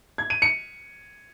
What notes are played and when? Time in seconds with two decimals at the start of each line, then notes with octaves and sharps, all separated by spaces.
0.18 G#6
0.30 D#7
0.42 C#7